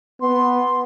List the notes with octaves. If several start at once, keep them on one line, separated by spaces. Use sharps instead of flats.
B3 C6